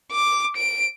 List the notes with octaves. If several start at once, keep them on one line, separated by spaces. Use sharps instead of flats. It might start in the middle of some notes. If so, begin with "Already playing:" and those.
D6
D7